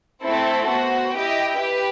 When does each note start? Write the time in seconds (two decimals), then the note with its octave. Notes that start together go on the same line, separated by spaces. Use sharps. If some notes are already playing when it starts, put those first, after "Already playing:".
0.23 A3 C4 E4 A4 C5
0.69 B3 F#4 C5
1.15 E4 G4 D#5 G5
1.60 G4 B4